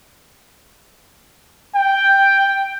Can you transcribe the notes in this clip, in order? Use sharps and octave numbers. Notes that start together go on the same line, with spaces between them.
G5